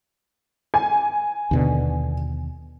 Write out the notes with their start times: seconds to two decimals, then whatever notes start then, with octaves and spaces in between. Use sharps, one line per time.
0.74 G#5
1.51 D#2 B2 D3